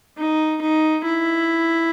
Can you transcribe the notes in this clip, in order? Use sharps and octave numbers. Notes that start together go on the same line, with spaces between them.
D#4
D#4
E4